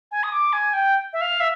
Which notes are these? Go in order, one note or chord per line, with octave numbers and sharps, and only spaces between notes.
G#5
D#6
D6
G#5
G5
E5
F5
E5